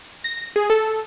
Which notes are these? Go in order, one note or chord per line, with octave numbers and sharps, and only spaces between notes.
A#6
G#4
A4